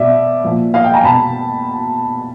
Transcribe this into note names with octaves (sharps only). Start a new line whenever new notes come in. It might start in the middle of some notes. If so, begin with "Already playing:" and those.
Already playing: B2 D5 E5
A#2 F3
D#5 F5
F5 G5
G#5 A#5
B2 A5 B5